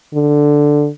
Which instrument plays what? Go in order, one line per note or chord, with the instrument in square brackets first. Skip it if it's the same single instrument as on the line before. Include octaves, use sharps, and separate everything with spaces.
[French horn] D3